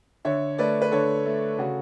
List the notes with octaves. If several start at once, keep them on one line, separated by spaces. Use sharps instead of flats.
D3 C#5 E5
A3 B4 D5
B4
D3 A4 C#5
A3
C#3 F#4 A4